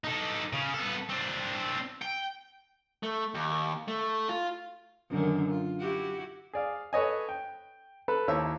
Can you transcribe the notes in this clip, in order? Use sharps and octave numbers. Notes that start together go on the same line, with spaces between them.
D#4 A4
C#3
B3 A4
C4 D4
G5
A3
D#2
A3
F4
F#2 D3 D#3
F4
E4 F#4 G4
G#4 D5 F5
A4 B4 C#5 D#5 G#5
G5
A4 B4 B5
D#2 E4 C5 C#5 E5 A5